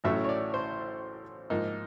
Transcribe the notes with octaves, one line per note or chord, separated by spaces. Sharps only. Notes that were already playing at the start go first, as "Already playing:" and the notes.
A1 A2 F#3 A3 C#4 E5
C#5
D5
C5
G#2 F3 A#3 D#4